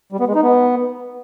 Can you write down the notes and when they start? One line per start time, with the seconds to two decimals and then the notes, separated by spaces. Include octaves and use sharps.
0.12 G3
0.20 B3
0.28 G#3
0.35 D#4
0.43 B3